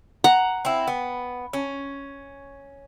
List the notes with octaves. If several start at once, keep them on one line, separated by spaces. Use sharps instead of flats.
F#5 A#5
C4 E4
B3
C#4